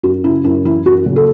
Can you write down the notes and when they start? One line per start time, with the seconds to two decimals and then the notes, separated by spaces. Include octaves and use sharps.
0.03 F#2 F#4
0.24 C#3 E4
0.44 F#2 E4
0.65 E3 E4
0.86 F#2 F#4
1.06 F#1
1.16 A4